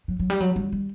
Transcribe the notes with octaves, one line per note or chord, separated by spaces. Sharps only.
F#3
F#3
G3
F#3
G3
G3